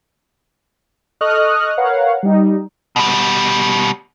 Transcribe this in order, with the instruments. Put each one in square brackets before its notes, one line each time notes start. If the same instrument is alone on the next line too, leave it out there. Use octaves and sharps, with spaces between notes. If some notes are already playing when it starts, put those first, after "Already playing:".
[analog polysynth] A4 D#5 C#6 D#6 F6 F#6
A#4 B4 C#5 F5 F#5
G3 D#4
[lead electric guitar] B2 G3